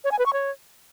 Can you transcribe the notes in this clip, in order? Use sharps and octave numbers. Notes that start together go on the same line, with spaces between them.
C#5
G#5
B4
C#6
C#5